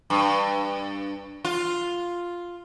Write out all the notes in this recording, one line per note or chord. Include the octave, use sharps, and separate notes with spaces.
G2
F4